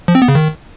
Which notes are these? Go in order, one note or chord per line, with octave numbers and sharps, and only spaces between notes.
F3
C4
B3
C#3
D#3